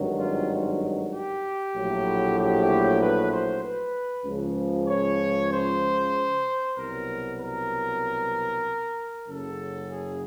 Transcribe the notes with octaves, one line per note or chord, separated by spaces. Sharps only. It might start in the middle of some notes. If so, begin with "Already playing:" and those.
Already playing: G#1 G2 D#3 F#3
F4
G4
A#1 A2 F#3
G4
B4
C5
B4
C#2 C#3 F3
C#5
C5
C2 B2 F#3 A#4
A#4
F#1 F#2 C#3 F#3 A4
G#4